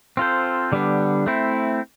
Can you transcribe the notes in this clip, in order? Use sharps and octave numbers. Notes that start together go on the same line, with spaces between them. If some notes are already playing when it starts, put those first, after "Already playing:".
C4 F4 A4 C5
D3 G3 B3 D4
A3 C4 E4